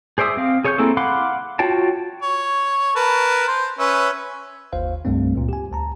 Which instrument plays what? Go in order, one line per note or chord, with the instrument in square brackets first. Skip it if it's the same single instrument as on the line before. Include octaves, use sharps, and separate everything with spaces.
[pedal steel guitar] G#4 C5 D5 E5 D#6
C4 F5
G#4 C#5 C#6 D#6 G6
A#3 C4 E4 G#4 A4
F5 F#5 B5 C6 D6
F4 F#4 C#5 G5 A5
[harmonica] C#5
A#4 B4 A5
C5
C#4 B4 E5
[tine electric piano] G1 D#2 C5 F5
C2 G2 G3 A3 C4
C#2 A#2
G4 G#5
D2 A5 A#5